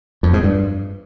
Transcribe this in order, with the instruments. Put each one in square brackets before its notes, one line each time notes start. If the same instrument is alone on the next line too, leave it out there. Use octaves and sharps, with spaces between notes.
[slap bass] F2
G#2
G2